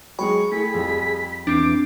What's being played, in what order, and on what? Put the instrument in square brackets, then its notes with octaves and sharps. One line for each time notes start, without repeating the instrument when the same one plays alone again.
[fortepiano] F#3 G#3 G#4 [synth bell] G5 B5 [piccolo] C#6
[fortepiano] A3 E4 [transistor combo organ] G#4 [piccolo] B6
[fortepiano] F2 G3
[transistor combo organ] E2 [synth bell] C4 D4 [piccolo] D6